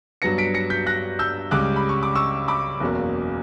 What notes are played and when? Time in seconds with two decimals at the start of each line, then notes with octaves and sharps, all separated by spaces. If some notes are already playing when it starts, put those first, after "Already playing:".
0.22 G2 F#3 B3 A#6 C#7
0.38 B6 D7
0.54 A#6 C#7
0.70 G6 B6
0.86 F#6 A#6
1.19 E6 G6
1.51 C#2 C#3 G3 D6 F#6
1.76 B5
1.89 C#6
2.03 D6
2.15 C#6 E6
2.48 B5 D6
2.80 F#1 E2 B2 A#3